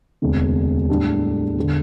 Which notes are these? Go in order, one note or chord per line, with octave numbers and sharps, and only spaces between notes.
E1 D2 C3
A2 G3 D4 G4
E1 D3